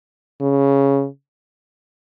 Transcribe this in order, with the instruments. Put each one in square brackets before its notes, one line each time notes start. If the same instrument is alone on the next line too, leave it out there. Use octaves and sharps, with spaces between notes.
[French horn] C#3